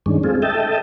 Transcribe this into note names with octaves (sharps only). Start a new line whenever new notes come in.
G2 D#3 G#3 C#4 D4
G#3 C4 F4 G#4 A4
A4 D#5 E5 G5 A5